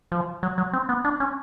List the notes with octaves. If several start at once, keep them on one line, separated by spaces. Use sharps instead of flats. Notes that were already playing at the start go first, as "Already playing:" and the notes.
F3
F#3
F#3
C4
B3
D4
C#4